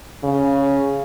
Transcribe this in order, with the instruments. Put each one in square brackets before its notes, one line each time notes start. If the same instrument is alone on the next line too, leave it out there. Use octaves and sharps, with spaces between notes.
[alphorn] C#3